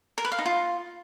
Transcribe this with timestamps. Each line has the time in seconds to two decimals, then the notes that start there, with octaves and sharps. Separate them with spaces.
0.18 A#4
0.25 B4
0.32 F5
0.39 D#4
0.46 F4